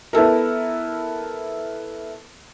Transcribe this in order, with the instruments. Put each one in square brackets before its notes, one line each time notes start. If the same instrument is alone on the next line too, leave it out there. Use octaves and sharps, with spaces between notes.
[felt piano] B3 E4 A4 A#4